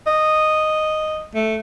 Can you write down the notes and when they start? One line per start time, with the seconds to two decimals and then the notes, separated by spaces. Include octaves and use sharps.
0.07 D#5
1.35 A3